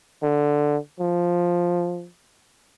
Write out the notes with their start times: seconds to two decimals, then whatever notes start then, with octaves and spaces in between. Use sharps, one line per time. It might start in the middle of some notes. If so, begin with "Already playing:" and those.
0.23 D3
1.00 F3